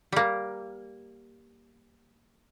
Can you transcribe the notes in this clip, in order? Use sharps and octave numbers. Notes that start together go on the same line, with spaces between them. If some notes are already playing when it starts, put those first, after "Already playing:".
G3 A#3